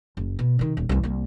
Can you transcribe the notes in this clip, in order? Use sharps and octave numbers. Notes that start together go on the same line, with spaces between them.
F#1
B2
C3 D#3
D#1
C2 E3
C2 A#3